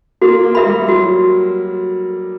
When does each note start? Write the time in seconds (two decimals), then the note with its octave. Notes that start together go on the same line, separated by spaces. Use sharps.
0.22 A#3 F#4
0.43 A#3
0.55 A#4 E5 B5
0.66 G3
0.88 F#3 F#4